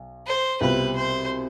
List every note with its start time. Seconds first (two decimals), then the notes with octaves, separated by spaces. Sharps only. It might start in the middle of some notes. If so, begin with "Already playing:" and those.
Already playing: B1
0.27 C5
0.61 C2 B2 G3 C4 F4 B4
0.96 C5